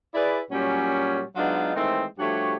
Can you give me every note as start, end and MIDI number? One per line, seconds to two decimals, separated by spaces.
0.15 0.40 64
0.15 0.40 68
0.15 0.40 71
0.15 0.40 74
0.51 1.23 46
0.51 1.23 54
0.51 1.23 55
0.51 1.23 61
1.36 1.73 54
1.36 1.73 56
1.36 1.73 59
1.36 1.73 62
1.36 1.73 63
1.36 1.73 65
1.75 2.04 51
1.75 2.04 52
1.75 2.04 56
1.75 2.04 57
1.75 2.04 60
2.18 2.57 43
2.18 2.57 53
2.18 2.57 57
2.18 2.57 66
2.18 2.57 67
2.18 2.57 73